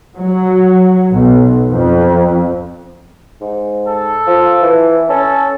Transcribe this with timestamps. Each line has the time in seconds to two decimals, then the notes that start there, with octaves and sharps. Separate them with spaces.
0.17 F#3
1.12 B1
1.69 F2
3.41 G#2
3.87 A4
4.27 F3
4.62 E3
5.10 C#4 A4